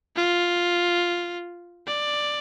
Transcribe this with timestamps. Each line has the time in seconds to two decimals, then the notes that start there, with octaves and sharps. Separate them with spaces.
0.16 F4
1.87 D5